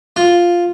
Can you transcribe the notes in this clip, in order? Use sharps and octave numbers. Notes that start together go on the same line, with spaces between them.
F4